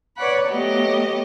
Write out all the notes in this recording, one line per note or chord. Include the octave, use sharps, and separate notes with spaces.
B4 C#5 D5 F#5 B5
F#3 A3 B3 G4 D#5